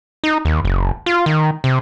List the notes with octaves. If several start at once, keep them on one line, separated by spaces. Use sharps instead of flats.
D#4
D#2
F#1
F4
D#3
C3